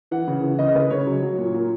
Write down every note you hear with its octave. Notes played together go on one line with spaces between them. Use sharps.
E3 F#5
C#3
E3
C#3 D#5
C#3 B4
C#3 C#5
F#3
F#3
A#2
A#2